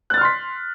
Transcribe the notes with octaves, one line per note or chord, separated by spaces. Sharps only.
C6 F6 F#6 A6 B6